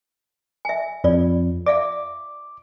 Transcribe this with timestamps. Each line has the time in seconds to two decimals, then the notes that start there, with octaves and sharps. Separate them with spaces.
0.65 E5 G#5
1.04 F2 F4 C#5 D5
1.66 D5 E5 F5 D6